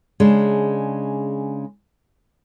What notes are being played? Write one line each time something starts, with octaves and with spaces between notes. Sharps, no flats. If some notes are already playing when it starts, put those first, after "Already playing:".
C#3 G#3 D4